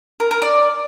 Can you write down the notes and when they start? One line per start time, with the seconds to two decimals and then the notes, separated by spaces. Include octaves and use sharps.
0.20 A#4
0.31 A#4
0.42 D5